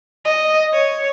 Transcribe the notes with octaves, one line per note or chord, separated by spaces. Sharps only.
D#5
C#5